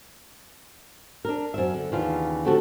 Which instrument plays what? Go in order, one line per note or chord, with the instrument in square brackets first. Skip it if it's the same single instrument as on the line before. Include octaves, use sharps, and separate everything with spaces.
[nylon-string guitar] D4 A#4
F#2 C5 E5
D3
D#2 C#3 E3 B3 D4 F4
D3 F3 A3 F#4 G4 A4